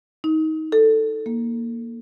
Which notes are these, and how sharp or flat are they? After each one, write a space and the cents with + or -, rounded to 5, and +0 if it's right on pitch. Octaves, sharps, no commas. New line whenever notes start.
D#4 +20
A4 +5
A#3 +5